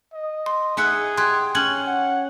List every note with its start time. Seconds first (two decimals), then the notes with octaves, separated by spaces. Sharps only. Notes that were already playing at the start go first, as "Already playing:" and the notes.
0.13 D#5
0.46 C6
0.77 D#4 G#4 E5 F#5
1.18 G4 C6 F#6 G#6
1.55 C#4 F#6 G#6 F#7
1.87 F#5